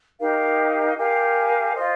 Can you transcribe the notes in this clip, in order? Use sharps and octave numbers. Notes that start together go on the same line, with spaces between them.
D#4 G4 A#4 F5
G4 A#4 F5 G#5
F4 C5 D#5